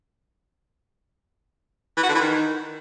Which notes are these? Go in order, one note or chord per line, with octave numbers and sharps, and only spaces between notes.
E3
F#4
D3
E3
D#3